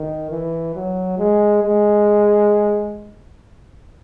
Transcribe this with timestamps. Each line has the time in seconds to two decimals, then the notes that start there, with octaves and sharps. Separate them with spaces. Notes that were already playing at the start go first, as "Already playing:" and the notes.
Already playing: D#3
0.31 E3
0.76 F#3
1.19 G#3
1.63 G#3